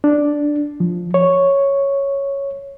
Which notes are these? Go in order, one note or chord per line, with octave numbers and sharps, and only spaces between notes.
D4
F3
C#5